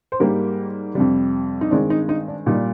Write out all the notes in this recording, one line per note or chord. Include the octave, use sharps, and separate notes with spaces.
C5
G#2 G3 A#3 G4 A#4
F2 C3 G3
D#4
G2 D#3 G#3 C4 D4
D#4
D#4
D4
A#2 G3 A#3 D#4